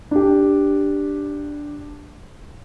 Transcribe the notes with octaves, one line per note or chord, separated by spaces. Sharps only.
D4 G4